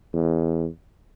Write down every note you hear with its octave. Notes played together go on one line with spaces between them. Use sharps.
E2